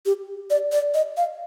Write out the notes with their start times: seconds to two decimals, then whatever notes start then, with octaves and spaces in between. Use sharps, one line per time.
0.06 G4
0.50 D5
0.72 D5
0.94 D#5
1.17 F5